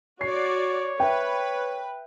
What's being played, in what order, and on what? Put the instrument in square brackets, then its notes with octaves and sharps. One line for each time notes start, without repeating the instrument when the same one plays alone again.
[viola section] F#4 D5 [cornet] C#5 [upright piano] C7
[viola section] B4 [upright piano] E5 G5